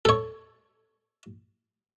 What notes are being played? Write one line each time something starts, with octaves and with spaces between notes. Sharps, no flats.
A4 C#5